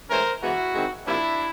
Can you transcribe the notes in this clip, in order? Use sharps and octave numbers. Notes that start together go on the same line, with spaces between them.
A2 E3 G#3 C#4 A#4 C5
E3 G#3 B3 E4 F#4
D#3 G#3 C4
C3 F3 A#3 D4 E4